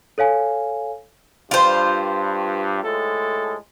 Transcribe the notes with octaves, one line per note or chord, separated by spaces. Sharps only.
A4 C#5 F5 G#5
G2 F4 C5
A2 G#3 A4